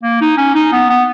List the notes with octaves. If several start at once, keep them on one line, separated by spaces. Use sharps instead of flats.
A#3
D#4
C#4
D#4
B3
B3